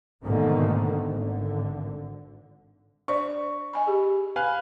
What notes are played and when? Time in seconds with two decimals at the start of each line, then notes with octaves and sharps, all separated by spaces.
0.24 G#2 B2 D3 D#3 A3 A#3
1.11 G#1 D3
3.08 D4 C5 D5 C#6
3.73 D#5 G#5 B5
3.87 G4 G#4
4.36 B4 F5 G#5